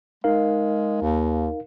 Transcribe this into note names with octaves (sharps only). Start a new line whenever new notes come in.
G#3 D#4 A#4 F5
D#2